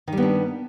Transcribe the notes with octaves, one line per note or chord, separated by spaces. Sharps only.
D#3 G3 B3 D4